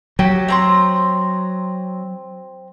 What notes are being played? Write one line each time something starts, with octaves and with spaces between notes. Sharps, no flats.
F#3 G4
C4 A#5 C6